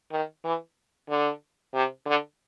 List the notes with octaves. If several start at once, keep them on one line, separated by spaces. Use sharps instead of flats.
D#3
E3
D3
C3
D3